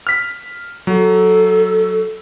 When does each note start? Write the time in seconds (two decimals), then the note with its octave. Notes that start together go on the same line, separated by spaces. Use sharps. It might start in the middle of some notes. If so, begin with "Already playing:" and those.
0.07 F6 B6
0.87 F#3 A4